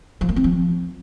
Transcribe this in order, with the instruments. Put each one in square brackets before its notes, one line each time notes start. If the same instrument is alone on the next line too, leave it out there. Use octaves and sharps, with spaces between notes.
[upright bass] F3
A#3
C4
F3